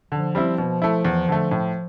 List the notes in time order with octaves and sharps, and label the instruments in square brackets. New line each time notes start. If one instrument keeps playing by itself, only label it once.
[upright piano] D3 [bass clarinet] F3
[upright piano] G3 C4 E4
B2
A3 E4
E2
D3 A3
A2